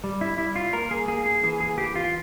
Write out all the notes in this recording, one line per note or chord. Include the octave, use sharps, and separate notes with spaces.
G3
E4
G3 E4
F4
A#3 A#4
G#4
A#3 G#4
G#4
E3 G#4
G#4
E3 G4
F4